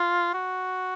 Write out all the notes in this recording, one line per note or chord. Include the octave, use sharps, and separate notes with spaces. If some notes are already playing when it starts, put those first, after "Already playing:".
Already playing: F4
F#4